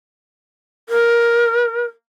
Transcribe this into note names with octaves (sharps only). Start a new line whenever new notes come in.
A#4